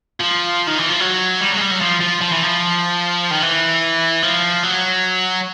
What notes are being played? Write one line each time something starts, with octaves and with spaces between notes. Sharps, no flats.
F3
D#3
E3
F3
F#3
G3
F#3
G#3
G3
F#3
F3
F3
F3
E3
F3
D#3
E3
F3
F#3